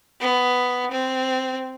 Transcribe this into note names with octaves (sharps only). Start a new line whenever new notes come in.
B3
C4